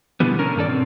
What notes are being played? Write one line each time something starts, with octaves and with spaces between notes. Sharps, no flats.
B2 D3 E3 G3 B3
D3 C#4 A#4
G2 D#3 A4 D5
B2 C4